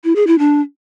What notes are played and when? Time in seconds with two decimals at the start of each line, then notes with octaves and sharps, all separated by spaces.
0.04 E4
0.16 G#4
0.27 E4
0.39 D4